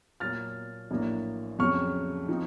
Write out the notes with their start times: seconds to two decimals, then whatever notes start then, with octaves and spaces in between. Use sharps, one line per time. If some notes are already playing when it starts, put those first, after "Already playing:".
0.20 A#2 F#3 A#3 F6 A6
0.91 A#1 A2 F#3 A#3
1.59 F2 C#3 F#3 C#6 F6
2.28 F3 C4 D#4